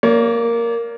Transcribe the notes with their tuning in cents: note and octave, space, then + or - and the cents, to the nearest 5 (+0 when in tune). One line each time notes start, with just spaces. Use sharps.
A#3 +0 C#5 +45